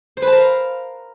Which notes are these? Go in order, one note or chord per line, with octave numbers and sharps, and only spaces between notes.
C5
B4
A5
A#4
F5